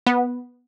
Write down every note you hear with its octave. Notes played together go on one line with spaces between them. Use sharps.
B3